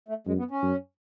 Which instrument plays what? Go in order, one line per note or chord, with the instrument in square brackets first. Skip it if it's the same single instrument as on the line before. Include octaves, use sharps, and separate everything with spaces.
[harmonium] A3
[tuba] F#2 [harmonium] G#3
[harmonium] B3
C#4
[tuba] F#2